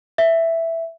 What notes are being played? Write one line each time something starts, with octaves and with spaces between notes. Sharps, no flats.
E5